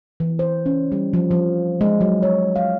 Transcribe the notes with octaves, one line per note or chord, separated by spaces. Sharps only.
E3
C5
C#4
G3
F3
F3
G#3
F#3
C#5
F5